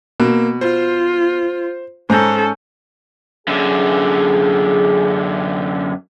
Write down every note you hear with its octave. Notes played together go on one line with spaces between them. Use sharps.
B2 A#3
F4 C5
G#2 C#4 A4 C5 A#5 G6
F#2 D3 G#4